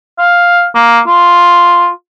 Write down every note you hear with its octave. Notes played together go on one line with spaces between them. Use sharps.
F5
A#3
F4